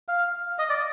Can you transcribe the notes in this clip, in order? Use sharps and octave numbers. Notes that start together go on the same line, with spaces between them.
F5
D#5
D5